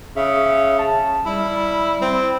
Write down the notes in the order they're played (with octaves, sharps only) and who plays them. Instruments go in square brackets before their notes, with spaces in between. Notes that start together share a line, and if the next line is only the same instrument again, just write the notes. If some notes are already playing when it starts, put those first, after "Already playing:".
[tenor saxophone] C#3 [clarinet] E5
[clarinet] A5
[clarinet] G3 [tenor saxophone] E4
[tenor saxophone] C4 [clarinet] E4